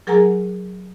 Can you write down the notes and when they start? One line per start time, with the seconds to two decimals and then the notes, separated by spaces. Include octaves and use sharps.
0.07 F#3 G#4 A#4 F#5 G#5 A#5